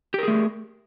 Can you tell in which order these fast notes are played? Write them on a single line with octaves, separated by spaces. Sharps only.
G4 A#4 G#4 A3